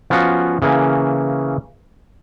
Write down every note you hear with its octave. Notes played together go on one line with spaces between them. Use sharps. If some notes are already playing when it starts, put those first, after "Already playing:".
F3 B3 C#4 F4 F#4
C#3 E3 A#3 C#4